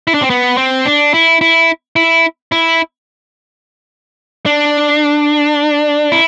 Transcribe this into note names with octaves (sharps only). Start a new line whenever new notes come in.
E4
D4
C4
B3
C4
D4
E4
E4
E4
E4
D4
E4